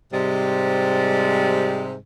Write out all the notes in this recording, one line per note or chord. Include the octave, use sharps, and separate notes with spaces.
G#2 C3 G3 G#3